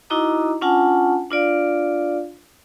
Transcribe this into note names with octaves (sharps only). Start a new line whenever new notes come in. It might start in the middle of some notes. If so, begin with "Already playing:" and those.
D#4 E4 F#4 D#5 A#5 D6
C#4 D4 F4 F#5 G#5 A5
D4 F4 D5 F5